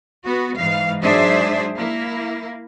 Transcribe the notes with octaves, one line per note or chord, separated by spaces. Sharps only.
B3 F#4
G#2 E3 F5
G#2 F#3 D4 G#4 C5 E5
A#3 E4